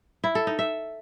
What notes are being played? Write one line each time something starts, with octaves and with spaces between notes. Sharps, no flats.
E4
A4
D#4
E5